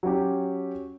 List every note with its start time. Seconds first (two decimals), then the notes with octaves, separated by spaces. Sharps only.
0.03 F#3 C#4 G4